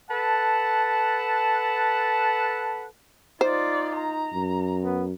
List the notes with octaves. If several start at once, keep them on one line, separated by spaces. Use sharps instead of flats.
A4 B4 F#5 A5
D#4 F4 C5 D5
A#5
F#2
B3